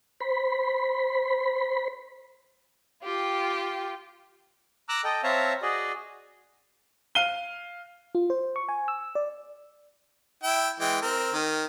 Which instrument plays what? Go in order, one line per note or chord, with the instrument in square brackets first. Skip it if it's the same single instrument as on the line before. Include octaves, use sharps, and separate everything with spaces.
[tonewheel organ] C5 B5
[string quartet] F4 G4 G5
[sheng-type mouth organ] A#5 D6 E6 F#6
A4 D#5 G5
C4 C#5 E5 F5 A5 A#5
F#4 G#4 D5 D#5
[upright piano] F5 D#7 G7
[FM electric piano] F4
C5
C#6
G#5
E6
D5
[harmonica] E4 G5
E3 G#3 G5
C4 A#4
D#3